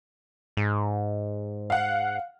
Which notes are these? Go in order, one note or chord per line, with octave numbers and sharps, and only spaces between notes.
G#2
F5 F#5